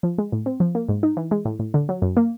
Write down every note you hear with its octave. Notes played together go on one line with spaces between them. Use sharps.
F3
G#3
A2
C4
F3
A#3
G#2
D#4
E3
G#3
A2
A2
D3
F#3
F#2
A#3